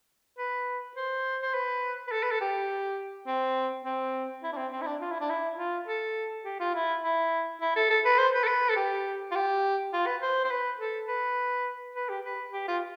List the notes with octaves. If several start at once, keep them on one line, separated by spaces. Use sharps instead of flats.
B4
C5
C5
B4
B4
A4
B4
A4
G4
C4
C4
E4
D4
C4
C4
E4
D4
F4
E4
D4
E4
F4
A4
G4
F4
E4
E4
E4
A4
A4
B4
C5
B4
A4
B4
A4
G4
F4
G4
F4
B4
C5
C5
B4
A4
B4
B4
G4
B4
G4
F4